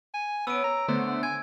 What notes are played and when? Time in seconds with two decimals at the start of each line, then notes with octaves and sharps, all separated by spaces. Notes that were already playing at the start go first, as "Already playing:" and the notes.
0.14 G#5
0.47 B3 C#4 E6 D7
0.64 A#5
0.88 D3 A3 B3 C5
1.23 G#5 G#6